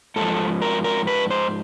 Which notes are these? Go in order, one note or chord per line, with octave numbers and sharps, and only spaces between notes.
G#2 F3 A4
A#4
A#4
B4
C5